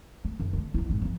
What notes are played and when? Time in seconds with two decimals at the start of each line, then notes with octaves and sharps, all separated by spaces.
0.25 A3
0.40 F#1 A3
0.53 D3 A3
0.74 E2 E4
0.89 G#2 G#3
1.02 D#3 F3